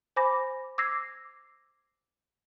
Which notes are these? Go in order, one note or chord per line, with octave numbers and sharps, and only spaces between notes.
C5 G#5 B5 D6 A#6
D6 E6 G#6 A#6 C7